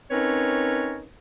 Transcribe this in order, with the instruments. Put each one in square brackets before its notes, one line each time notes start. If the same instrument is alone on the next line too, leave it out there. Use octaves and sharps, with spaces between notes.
[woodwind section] C4 C#4 D#4 A#4 B4 C#5